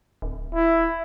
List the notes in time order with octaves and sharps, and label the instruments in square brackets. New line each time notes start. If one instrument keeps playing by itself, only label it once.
[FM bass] D1
[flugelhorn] E4